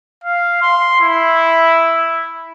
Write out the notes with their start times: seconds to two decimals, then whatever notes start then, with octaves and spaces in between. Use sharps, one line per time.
0.24 F5
0.62 C6
1.01 E4